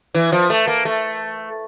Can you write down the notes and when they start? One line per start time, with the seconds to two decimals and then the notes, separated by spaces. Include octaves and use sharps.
0.14 E3
0.32 F3
0.50 A3
0.67 A#3
0.85 A3